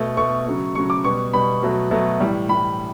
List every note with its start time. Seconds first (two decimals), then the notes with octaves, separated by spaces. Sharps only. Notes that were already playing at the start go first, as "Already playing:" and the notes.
Already playing: B2 A3
0.17 B2 A3 C#6
0.46 C#3 F#3 A3
0.75 C#3 F#3 A3 C#6
0.90 D6
1.04 B2 G3 B3 C#6
1.33 B2 G3 B3 B5
1.62 B2 F#3 A3
1.91 B2 F#3 A3
2.20 A2 E3 G3
2.49 A2 E3 G3 B5